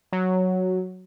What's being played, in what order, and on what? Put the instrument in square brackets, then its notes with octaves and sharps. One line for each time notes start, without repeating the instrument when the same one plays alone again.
[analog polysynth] F#3